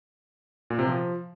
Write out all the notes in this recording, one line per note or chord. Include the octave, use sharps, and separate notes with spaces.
A#2
C3
F3